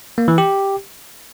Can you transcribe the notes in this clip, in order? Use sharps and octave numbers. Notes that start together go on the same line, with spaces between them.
A#3
E3
G4